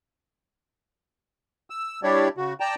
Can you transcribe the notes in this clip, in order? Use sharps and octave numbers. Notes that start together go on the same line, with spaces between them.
E6
G3 D4 E4 G4 C#5 D5
C#3 F#4
D5 G5 A5 A#5